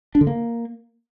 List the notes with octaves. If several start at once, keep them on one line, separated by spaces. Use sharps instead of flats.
D4
D3
A#3